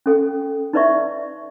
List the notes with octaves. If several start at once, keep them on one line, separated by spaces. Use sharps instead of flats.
C#4 A4 G5
D#4 E4 B4 D5 E5 C#6